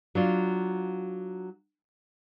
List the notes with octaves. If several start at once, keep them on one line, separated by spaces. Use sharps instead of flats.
F#3 D4 F4